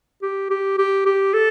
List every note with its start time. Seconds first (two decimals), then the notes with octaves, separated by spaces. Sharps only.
0.22 G4
0.50 G4
0.78 G4
1.06 G4
1.34 A4